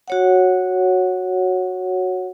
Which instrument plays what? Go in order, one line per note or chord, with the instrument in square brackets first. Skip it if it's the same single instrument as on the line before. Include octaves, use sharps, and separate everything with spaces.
[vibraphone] F#4 C#5 F#5